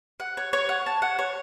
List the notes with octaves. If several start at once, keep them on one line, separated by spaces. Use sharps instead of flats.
F#5
C#5
C#5
F#5
A5
F#5
C#5